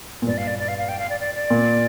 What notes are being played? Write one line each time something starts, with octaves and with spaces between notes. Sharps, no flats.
A#2
G2 D5
F5
D5
D5
F5
F5
G5
F5
D5
D5
D5
A#2